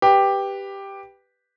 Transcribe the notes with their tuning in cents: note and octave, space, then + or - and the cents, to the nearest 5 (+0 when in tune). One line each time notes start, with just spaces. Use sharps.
G4 +5 B4 +0